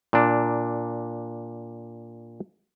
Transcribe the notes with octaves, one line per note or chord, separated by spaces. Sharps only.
A#2 D4